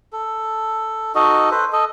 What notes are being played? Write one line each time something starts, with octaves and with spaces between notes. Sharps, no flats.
A4
D#4 F#4 A4 D#5
A4 B4 C5
A4 D#5